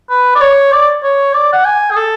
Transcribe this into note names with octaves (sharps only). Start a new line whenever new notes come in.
B4
D5
C#5
D5
C#5
D5
F#5
G#5
G#4
A4